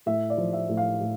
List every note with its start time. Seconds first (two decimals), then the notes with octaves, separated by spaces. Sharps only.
0.06 A2 E5
0.30 D5
0.38 F3
0.53 E5
0.69 A2
0.77 F5
1.01 A2